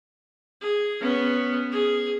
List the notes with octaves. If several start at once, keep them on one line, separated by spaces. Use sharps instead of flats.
G#4
B3 C#4
G#4